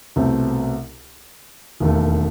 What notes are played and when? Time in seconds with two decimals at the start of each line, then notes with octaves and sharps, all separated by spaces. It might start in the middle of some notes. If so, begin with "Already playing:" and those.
0.16 C2 B2 A3 C4
1.80 E1 D#2 D#3 A3